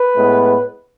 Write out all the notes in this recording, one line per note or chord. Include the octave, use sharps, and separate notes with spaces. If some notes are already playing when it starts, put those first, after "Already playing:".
Already playing: B4
A2 G#3 B3